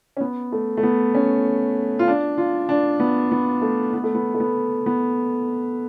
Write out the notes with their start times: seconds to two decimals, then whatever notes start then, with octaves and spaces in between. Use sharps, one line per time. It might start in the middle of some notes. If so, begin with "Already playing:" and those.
0.17 C#4
0.21 B3
0.52 A3
0.77 A3
0.83 B3
1.14 C#4
1.99 F4
2.08 D4
2.38 F4
2.69 D4
3.00 B3
3.32 B3
3.62 A3
3.93 B3
4.04 A3
4.15 B3
4.34 A3
4.40 B3
4.86 B3